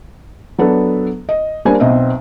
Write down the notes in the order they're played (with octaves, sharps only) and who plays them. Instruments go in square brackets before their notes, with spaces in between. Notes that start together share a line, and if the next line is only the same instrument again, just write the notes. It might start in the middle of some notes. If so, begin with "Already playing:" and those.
[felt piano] F#3 B3 D4 A4 B4
D#5
G3 A#3 D4 C5 G#5
B1 B2 C4 D#5 E5